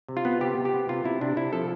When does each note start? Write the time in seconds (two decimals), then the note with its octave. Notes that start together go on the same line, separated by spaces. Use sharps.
0.08 C3
0.17 F4
0.25 B3
0.41 C3 G4
0.58 C3
0.65 G4
0.74 B3
0.89 C3 F4
1.05 C3 E4
1.21 C3 D4
1.37 C3 E4
1.53 F3 A4